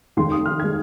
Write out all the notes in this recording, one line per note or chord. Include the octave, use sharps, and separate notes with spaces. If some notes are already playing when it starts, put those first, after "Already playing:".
F1 D#2 D#3 G#3 C6
D#6
F6
D#3 G#3 G#6